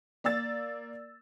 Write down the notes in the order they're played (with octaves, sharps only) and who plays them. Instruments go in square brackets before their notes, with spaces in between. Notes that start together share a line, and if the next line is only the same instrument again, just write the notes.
[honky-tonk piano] A#3 D5 E6 A6